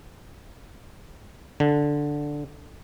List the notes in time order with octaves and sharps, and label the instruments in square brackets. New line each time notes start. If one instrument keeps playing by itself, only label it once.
[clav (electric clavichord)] D3